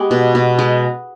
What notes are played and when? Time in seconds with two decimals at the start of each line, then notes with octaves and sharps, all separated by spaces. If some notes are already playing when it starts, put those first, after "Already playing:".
Already playing: G#3 B3 G4
0.11 B2
0.35 B2
0.59 G#3